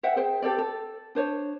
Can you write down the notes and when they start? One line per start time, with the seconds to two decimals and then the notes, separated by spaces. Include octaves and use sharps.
0.03 C5 E5 F#5 G5
0.16 G#4 C5 G5
0.42 G4 A4 C5 D5
0.58 A4
1.15 D4 C5 C#5